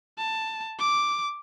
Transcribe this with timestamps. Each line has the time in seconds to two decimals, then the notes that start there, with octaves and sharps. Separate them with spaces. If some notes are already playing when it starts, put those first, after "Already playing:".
0.18 A5
0.79 D6